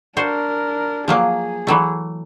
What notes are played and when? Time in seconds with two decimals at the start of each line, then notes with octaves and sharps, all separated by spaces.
0.17 D4 F#4 A#4 C5
1.08 F3 F#3 A#3 G#4
1.67 E3 F#3 A3